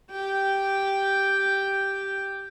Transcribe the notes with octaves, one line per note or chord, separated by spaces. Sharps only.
G4 G5